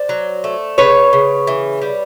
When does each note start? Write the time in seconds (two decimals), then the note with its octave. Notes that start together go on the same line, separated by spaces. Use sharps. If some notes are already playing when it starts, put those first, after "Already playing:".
Already playing: C5 D5
0.09 F#3
0.44 A3
0.78 C#3 B4 C#5
1.13 C#3
1.47 E3
1.82 G3